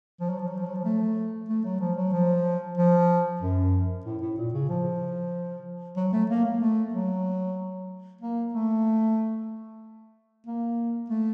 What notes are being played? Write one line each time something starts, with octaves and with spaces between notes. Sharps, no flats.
F3
F#3
F3
F#3
F3
F#3
F3
A3
A3
F#3
F3
F#3
F3
F3
F#2
A2
A2
A#2
C#3
F3
F#3
A3
A#3
A#3
A3
F#3
A#3
A3
A#3
A3